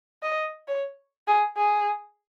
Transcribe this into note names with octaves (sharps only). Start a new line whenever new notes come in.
D#5
C#5
G#4
G#4